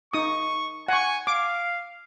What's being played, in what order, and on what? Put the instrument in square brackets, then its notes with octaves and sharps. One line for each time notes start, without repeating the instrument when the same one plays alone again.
[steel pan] D#4 D#6 [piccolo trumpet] C#6
[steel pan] F#5 C#6 [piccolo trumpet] G#5
[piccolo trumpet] F5 [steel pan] D6